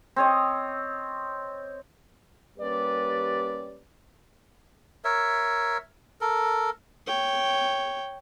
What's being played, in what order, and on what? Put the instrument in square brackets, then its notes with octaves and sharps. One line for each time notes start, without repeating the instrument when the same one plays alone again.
[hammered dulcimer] C4 C#5 D#5
[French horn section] G3 A#3 C#4 G4 B4 D5
[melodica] A#4 C#5 E5
A4 A#4
[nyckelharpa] C#5 G5